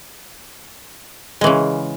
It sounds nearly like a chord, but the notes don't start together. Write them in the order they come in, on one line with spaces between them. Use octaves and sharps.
G#3 E3 C#3